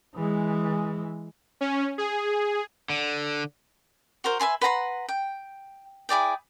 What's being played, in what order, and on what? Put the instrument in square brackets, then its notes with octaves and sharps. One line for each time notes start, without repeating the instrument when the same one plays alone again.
[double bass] E3 G#3
[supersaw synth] C#4
G#4
[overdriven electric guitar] D3
[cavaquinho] F#4 A#4 C5
B4 E5 G#5 C6
B4 F#5 A#5 C6
G5
E4 G#4 D5 G5